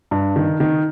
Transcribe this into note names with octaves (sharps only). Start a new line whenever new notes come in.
G2
D#3
D#3